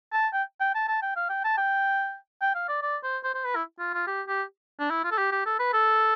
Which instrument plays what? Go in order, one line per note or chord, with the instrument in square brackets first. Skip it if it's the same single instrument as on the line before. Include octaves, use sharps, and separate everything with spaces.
[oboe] A5
G5
G5
A5
A5
G5
F5
G5
A5
G5
G5
F5
D5
D5
C5
C5
C5
B4
E4
F4
F4
G4
G4
D4
E4
F4
A4
G4
G4
A4
B4
A4